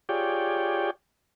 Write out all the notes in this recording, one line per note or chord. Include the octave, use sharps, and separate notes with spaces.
F4 G4 G#4 C#5 D5 G5